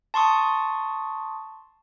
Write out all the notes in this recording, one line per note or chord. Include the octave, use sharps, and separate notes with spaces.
A5 C6 C#6 D#6